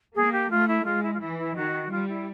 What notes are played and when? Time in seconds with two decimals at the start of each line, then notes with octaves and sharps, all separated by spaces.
0.15 A#3 G#4
0.32 G4
0.50 A3 F4
0.67 E4
0.85 G#3 F4
1.02 E4
1.13 F4
1.20 E3 E4
1.38 E4
1.55 D#3 F#4
1.90 G3 F4
2.08 E4